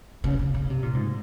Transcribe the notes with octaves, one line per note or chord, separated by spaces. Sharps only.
C#3
C#3
C#3
C3
A#2
G#2